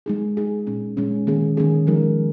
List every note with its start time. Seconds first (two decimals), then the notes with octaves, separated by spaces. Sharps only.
0.06 G#3 D#4 G#4
0.37 G#3 D#4 G#4
0.67 A#2 G#3 C#4
0.97 A#2 G#3 C#4
1.27 D#3 A#3 C#4 G#4
1.57 D#3 A#3 C#4 G#4
1.87 F3 G#3 D#4 A#4